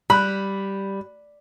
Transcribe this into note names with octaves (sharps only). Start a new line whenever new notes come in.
G3 B5 F#6